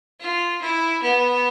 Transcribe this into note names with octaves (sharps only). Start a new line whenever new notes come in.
F4
E4
B3